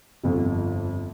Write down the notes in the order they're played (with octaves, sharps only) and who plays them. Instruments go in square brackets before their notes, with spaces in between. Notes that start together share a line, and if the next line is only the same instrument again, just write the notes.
[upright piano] G1 F2